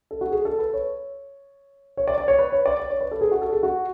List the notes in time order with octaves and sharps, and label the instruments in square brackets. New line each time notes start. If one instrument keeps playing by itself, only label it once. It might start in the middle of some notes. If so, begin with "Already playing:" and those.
[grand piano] A4
F#4
G#4
A4
B4
C#5
C#5
D5
D5
C#5
B4
C#5
D5
D5
C#5
B4
A4
G#4
F#4
A4
G#4
F#4